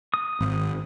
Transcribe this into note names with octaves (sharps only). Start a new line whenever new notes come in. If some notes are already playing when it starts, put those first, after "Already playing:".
D#6
G#1